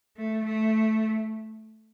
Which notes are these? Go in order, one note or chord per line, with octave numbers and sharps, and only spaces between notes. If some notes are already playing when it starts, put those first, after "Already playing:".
A3
A3